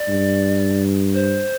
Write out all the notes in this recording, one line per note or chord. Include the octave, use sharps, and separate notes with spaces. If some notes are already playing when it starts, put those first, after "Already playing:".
Already playing: D5
G2
C5